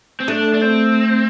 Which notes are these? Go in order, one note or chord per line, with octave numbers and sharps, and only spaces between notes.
C4
A3 D4
D4
C4